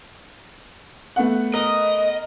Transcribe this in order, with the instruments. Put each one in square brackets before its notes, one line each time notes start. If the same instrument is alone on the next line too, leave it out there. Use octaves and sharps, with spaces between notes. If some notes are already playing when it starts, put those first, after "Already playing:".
[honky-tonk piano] A3 B3 F#5
[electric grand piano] A#4 [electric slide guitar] D#5